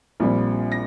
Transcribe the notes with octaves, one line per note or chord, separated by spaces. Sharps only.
A#1 A#2 G3 C4
A#6